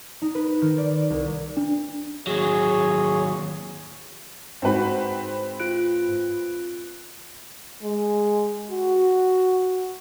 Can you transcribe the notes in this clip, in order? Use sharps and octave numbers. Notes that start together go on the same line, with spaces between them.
D#4
B4
D#3
D5
C2
D4
D#2 F#3 G#4 C#5
G#2 C4 D#4 F#4 B4
F4 F#6 D7
G#3
F#4